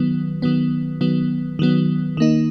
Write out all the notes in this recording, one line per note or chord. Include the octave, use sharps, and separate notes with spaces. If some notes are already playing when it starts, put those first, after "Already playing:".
Already playing: D#3 F#3 B3
D#3 F#3 B3
D#3 F#3 B3
D#3 F#3 B3
D#3 A#3 D#4